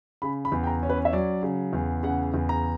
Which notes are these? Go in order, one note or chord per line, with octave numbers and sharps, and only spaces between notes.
C#3 B5
B5
E2
G5
A#5
C#4
B4
E5
F#3 D5
C#3
E2
C#3 F#5
E2
A#5